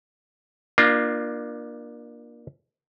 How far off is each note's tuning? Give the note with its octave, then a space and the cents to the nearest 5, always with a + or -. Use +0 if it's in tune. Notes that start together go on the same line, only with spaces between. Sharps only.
A#3 +25 D4 +30 F4 -10